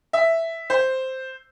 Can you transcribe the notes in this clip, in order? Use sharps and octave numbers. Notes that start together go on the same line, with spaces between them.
E5
C5